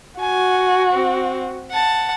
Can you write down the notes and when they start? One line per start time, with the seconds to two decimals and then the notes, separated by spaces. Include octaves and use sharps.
0.21 F#4 G#5
0.92 C4
1.71 F#5 A5